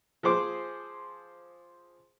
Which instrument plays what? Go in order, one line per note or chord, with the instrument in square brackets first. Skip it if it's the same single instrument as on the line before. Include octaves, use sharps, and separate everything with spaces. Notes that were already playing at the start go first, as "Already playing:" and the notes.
[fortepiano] F3 G#4 C5 D6